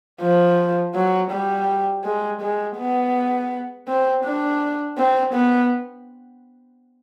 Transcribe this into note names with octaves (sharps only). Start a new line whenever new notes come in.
F3
F#3
G3
G#3
G#3
B3
C4
D4
C4
B3